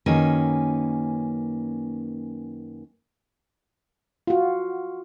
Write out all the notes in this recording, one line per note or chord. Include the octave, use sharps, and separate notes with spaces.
F#2 D#3 A#3 C#4 B4 G#5
F4 F#4